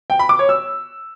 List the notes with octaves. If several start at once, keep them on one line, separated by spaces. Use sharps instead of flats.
G5
B5
D6
C#5
E6